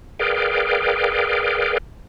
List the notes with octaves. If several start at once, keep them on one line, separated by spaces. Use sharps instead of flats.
G#4 A#4 B4 D5 F5 G5